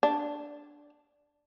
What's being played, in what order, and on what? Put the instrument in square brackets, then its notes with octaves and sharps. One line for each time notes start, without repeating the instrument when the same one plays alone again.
[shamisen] D4